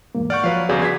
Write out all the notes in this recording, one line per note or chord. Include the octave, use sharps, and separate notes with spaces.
E2 G#2 A#3
D5 F#5 C#6 F6 G6
F3 F#3 B4 C#5 F5
G1 E2 C#3 F#4 G#4 D5
G#6 B6